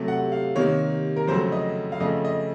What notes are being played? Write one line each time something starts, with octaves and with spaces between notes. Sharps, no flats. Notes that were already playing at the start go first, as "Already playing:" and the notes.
Already playing: C3 F#3 A3
F#5
F5
C3 D#3 A#3 C#5
A#4
F2 C#3 F#3 A3 C5
D#5
F5
F2 C#3 A3 D#5
D#5